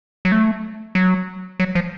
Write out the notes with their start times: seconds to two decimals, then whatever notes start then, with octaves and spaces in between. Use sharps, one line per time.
0.25 F#3
0.32 A3
0.95 F#3
1.60 F#3
1.75 F3